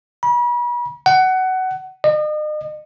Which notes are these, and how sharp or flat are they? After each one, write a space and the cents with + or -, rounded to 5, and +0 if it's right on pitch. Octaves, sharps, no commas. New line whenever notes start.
B5 -40
F#5 +20
D#5 -40